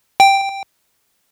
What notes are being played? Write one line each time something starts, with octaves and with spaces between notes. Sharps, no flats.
G5